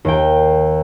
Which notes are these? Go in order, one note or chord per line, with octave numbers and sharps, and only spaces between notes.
D#2 G5